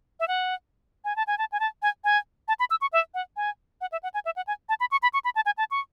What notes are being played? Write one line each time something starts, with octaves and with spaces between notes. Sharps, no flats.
E5
F#5
G#5
A5
G#5
A5
G#5
A5
G#5
G#5
A5
B5
E6
C#6
E5
F#5
G#5
F#5
E5
F#5
G#5
E5
F#5
G#5
A5
B5
C#6
B5
C#6
B5
A5
G#5
A5
C#6